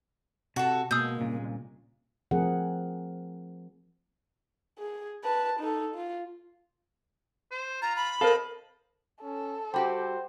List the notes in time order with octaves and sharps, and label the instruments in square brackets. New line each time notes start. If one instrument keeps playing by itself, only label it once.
[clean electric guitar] C3 [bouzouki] F#4 A4
[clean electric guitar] B2 [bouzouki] G#3 [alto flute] A#3 [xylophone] D#6 E6 G6
[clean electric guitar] C2 A#2 C#3
[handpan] F3 A3 C4 G#4 A#4 F#5
[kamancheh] G#4
B4 A5
D#4 A4
F4
[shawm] C5
[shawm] F4 [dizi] A#5
[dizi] B5
[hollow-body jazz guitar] A4 [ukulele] A#4 C5 F5 [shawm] D#5
[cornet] C#4 [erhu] A4
[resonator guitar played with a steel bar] G3 F#4 G4 [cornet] C5 [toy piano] G5